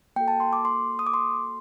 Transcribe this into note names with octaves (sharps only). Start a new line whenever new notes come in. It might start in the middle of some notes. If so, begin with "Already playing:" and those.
A#3 F#4 A4 G5
A5
C6
D6
C6
D#6
D6
C6